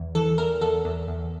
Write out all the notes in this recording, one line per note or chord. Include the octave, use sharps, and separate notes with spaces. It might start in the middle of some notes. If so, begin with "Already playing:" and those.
Already playing: E2
E3 A4
E2 A#4
E2 A4
E2
E2